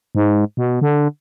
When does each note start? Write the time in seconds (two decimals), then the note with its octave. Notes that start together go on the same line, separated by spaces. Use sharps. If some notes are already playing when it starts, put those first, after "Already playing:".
0.15 G#2
0.57 B2
0.81 D3